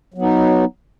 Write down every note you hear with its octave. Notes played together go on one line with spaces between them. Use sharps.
F#3 B3 D#4